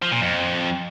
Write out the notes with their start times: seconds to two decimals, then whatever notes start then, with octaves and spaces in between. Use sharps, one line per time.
0.02 F3
0.12 A#2
0.21 F2